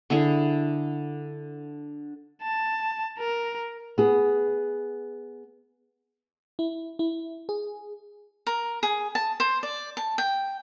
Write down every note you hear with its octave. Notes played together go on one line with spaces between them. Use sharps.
D3 E4 G#4
A5
A#4
B3 G#4
E4
E4
G#4
A#4
G#4
A5
C5
D5
A5
G5